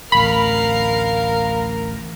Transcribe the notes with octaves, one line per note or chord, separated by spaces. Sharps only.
D1 A1 A#4 F5 B5